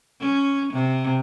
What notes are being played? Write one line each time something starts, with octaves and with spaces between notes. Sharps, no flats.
C#4
C3